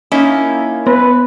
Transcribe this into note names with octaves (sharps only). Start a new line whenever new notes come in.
A#3 C#4 D#4 E4
B3 B4